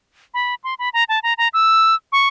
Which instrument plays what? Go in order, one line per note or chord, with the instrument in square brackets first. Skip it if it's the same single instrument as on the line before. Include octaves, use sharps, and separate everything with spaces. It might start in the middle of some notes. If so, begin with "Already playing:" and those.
[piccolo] B5
C6
B5
A#5
A5
A#5
A#5
E6
C#6